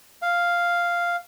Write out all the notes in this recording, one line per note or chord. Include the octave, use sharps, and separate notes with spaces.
F5